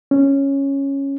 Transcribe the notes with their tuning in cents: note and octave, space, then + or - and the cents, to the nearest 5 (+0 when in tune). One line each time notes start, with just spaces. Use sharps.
C#4 -5